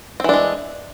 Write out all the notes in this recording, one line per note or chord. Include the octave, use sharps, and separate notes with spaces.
E3 G#3 C4 D4